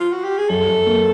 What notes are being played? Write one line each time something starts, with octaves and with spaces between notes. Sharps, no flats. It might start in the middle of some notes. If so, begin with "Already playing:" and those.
F4
F#4
G4
G#4
F#2 A4
F#2
A#3